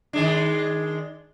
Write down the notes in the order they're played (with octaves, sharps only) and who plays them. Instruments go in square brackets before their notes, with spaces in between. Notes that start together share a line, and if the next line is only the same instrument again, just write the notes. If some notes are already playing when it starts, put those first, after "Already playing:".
[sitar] D#3 G#3 D4